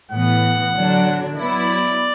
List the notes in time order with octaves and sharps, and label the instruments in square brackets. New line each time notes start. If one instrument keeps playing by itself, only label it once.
[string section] A2 E3 B3 [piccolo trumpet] F#5
[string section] D3 F#3 D4
[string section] F#3 B3 E4 [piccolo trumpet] D5